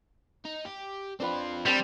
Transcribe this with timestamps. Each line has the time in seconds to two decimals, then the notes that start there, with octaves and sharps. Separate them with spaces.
0.45 D#4
0.65 G4
1.20 C4 D4 F4 B4 G5
1.66 G3 C4 A5 D6